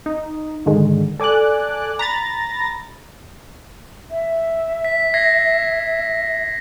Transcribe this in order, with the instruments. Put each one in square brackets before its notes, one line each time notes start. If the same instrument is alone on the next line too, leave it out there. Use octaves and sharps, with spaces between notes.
[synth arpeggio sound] D#4
G#2 D3 D#3 G#3
A4 D5 G#5 D6 F#6
A#5 B5 A6 A#6
[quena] E5
[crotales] B6
G#6 A#6 C7